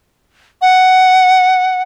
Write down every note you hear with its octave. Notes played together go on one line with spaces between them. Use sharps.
F#5